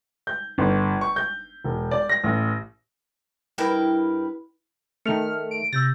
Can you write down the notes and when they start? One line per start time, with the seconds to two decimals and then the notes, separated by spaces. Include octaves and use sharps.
0.27 G6
0.58 G1
1.01 C#6
1.16 G6
1.64 E1
1.91 D5
2.09 A#6
2.24 A1
3.58 G2 E4 A#4 B4 G5
5.06 D#3 A3 F6 C#7 F7
5.51 D7
5.73 C3 E6 G6 A6 A#6